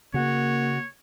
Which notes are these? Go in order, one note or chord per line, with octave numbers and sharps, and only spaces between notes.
C#3 A#3 F#4 C#5